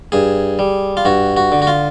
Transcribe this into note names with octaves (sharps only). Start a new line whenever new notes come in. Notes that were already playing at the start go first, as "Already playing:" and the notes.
G2 G#4
G3
F4
G2 F#4
F#4
D3
F#4
F4